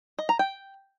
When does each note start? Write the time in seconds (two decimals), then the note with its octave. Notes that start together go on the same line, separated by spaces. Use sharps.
0.19 D#5
0.29 A#5
0.39 G5